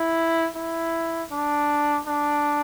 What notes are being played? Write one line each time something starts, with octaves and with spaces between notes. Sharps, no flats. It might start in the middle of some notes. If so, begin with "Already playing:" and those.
Already playing: E4
E4
D4
D4